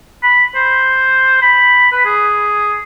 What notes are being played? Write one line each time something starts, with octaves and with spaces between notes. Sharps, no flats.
B5
C5
B5
B4
G#4